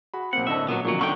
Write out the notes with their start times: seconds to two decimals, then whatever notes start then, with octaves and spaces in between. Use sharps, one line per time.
0.14 F#4 G#4 B5
0.33 B1 A#3 C4 F#5
0.47 A2 D3 C4 D#5 E5 A5
0.68 A#2 F#3 B3
0.85 A#2 D#3 F3 F#3 C#4 C#6
0.99 D#2 D3 A4 F#5 G5 C#6 F#7